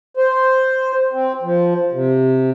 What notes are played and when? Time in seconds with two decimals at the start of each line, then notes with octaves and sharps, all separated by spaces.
0.17 C5
1.13 C4
1.43 F3
1.92 C3